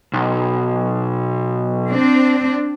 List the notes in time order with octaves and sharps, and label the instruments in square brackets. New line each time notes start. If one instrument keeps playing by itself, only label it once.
[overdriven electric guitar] B1
[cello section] C4 D4